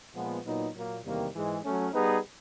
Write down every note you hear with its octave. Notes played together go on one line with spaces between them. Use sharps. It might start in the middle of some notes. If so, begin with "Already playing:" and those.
A#2 F3 G#3 B3
A#2 F#3 B3 D#4
A#2 F#3 A#3
E2 C3 D#3 G3 A#3
G#2 E3 G#3
F#3 A3 C#4
G3 B3 D#4 G#4 B4